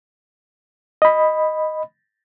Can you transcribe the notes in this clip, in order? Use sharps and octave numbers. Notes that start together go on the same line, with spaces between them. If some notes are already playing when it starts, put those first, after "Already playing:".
D#5 B5